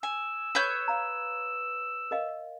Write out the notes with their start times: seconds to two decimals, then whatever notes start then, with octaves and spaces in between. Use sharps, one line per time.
0.03 G#5 E6
0.55 B4 C#5 G6
0.88 F5 A#5
2.11 A#4 D#5 F5